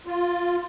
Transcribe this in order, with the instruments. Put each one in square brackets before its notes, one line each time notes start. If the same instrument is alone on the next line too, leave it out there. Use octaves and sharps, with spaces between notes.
[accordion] F4